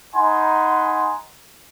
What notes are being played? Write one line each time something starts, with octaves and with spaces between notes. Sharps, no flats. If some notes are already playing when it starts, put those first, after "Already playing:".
D#4 F#5 G#5 B5 C6